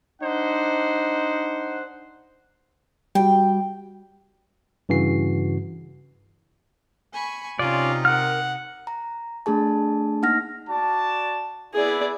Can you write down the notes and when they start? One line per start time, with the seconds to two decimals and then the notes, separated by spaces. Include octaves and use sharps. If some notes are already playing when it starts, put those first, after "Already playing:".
0.22 D4 D#4 C5 F#5
3.15 G3 F#4 G5
4.89 G2 C#3 E3 F#4 C7
7.12 G#5 B5 C#6
7.59 C3 C#4 D#4 F4 D5
8.05 A#4 F#5 F6
8.87 A#5
9.46 A3 D4 G#4 A5
10.22 A#3 D#4 F#5 F6 A#6
10.69 F#4 D5 A5
11.74 B3 E4 G#4 D5